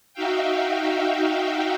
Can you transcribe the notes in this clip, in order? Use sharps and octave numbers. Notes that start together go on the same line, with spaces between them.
D#4 F#4 E5 F5 G5